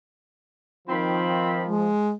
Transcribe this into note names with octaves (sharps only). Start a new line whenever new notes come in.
D#3 F3 C4 B5
G#3